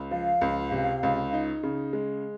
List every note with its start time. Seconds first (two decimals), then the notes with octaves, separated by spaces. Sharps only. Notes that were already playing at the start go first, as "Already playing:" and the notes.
Already playing: C#2
0.11 F3 F5
0.41 C#2
0.72 C3
1.03 C#2
1.33 D#4
1.63 C#3
1.93 G#3